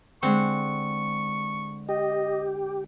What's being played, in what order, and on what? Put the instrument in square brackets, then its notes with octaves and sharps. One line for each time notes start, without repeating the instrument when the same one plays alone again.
[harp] D3 G#3 [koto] C4 [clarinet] C#6
[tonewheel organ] G4 [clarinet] D#5